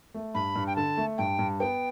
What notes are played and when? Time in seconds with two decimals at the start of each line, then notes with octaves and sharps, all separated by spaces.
0.14 A3
0.34 G2 B5
0.56 G2
0.67 G5
0.76 D3 A5
0.97 A3
1.18 G2 G5
1.39 G2
1.60 B3 G5